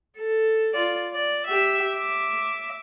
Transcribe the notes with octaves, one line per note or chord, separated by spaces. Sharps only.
A4
F4 D5
D5
G4 E5
E5 D6